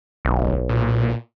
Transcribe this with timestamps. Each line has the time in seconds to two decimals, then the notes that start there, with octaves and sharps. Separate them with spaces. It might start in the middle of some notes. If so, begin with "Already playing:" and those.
0.25 D1 B1
0.69 A#2